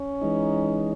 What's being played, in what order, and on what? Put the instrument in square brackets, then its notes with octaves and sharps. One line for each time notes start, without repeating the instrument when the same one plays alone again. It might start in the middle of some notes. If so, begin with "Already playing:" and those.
Already playing: [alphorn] C#4
[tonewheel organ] E3 G#3 D#4